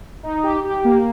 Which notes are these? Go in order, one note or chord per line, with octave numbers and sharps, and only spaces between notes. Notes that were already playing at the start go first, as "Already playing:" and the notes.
D#4
G4
G4
A#3